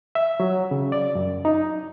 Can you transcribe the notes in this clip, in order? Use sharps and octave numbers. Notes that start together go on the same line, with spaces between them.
E5
F#3
C#3
D5
F#2
D#4